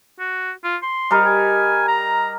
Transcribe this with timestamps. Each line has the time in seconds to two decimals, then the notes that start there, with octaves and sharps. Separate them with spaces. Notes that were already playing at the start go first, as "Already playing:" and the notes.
0.19 F#4
0.64 F4
0.82 C6
1.11 G3 A#4 D#5
1.26 G#5
1.88 A#5